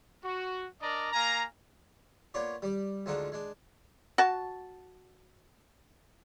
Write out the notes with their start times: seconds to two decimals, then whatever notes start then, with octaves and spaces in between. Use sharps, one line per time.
0.24 F#4
0.81 D4 A#4 D5 D#5 A#5
1.13 A#3 F5 G#5 A#5
2.34 A#3 B3 F4 C#5 D5
2.62 G3 D5
3.06 D2 F3 G#3 D4 D#4 F#5
3.32 G#3 D4
4.18 F#4 A5